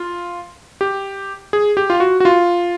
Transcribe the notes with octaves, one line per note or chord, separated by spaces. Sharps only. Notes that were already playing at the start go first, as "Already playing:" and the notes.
Already playing: F4
G4
G#4
G4
F4
F#4
F#4
F4